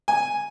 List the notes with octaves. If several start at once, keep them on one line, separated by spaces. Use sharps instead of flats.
G#5